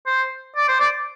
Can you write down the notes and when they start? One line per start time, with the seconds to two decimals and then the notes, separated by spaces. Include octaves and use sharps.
0.06 C5
0.56 D5
0.68 C5
0.79 D5